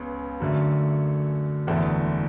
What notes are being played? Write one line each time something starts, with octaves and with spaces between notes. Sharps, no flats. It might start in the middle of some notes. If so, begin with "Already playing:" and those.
Already playing: C#2 C#3 B3
F#2 D3 A3
F#1 E2 D3 A3